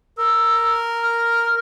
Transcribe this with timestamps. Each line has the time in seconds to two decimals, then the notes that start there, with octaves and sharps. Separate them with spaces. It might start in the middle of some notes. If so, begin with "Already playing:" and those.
0.18 A#4 E6
1.03 F6